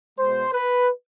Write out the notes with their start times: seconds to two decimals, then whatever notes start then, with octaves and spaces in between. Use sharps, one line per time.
0.18 B2 G#3 C5
0.53 B4